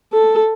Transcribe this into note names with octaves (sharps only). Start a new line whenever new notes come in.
A4